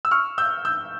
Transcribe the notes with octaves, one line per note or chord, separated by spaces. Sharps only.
E6
C#6 F6
E6 G6
E6 G6